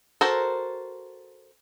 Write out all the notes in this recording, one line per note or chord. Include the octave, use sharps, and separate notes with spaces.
F#4 A4 A#4 C5